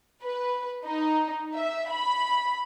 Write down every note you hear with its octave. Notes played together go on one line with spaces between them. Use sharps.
B4
D#4
E5
B5